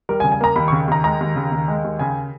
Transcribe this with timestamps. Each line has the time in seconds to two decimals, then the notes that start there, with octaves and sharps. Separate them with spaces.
0.09 G3 A#4
0.20 G#5
0.24 C#3
0.32 G#5
0.41 A#3 A#5
0.56 D#2 B5
0.68 C#6
0.72 C#3
0.88 D#2 A#5
1.04 G#3 A#5
1.21 D#2
1.36 C#3
1.52 D#2
1.68 G#3
1.84 D#2
1.99 C#3 G#5